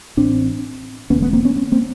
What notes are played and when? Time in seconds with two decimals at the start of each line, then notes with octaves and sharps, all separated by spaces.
0.17 A1 A2 C4 D4
1.10 E1 D2 D3 B3 C#4
1.22 A3 B3
1.33 A#3 C4
1.45 B3 C#4
1.56 B3 C#4
1.72 A#3 C4